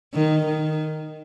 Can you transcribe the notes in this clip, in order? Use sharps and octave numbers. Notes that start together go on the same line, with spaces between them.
D#3
D#3